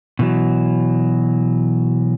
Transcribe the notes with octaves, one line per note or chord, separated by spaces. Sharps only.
B2 E3 F#3